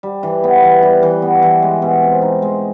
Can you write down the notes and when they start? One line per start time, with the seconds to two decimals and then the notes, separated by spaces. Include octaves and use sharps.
0.03 G3
0.23 E3
0.44 B3
0.63 E3
0.83 G3
1.03 E3
1.22 B3
1.43 E3
1.62 G#3
1.82 B2
2.03 C4
2.22 D#4
2.42 G#3